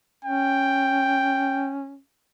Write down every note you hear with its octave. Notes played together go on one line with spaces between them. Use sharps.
C#4 G5